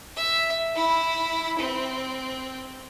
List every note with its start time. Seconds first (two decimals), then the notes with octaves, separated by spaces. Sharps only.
0.16 E5
0.75 E4
1.59 C4